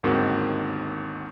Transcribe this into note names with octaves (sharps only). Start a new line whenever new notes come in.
G1 D#2 G#2 D#3 C4 F#4